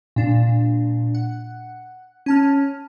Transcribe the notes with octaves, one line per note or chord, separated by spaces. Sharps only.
A#2 D4
F#5
C#4 A5 F6